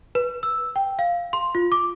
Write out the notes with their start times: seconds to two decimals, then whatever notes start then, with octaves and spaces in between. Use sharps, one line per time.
0.15 B4
0.43 E6
0.76 G5
0.99 F5
1.33 C6
1.55 F4
1.72 D6